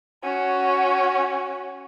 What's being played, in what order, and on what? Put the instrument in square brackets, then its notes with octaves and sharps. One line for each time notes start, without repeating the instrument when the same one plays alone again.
[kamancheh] C#4 F#4